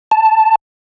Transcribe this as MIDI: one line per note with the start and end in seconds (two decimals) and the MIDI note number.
0.11 0.55 81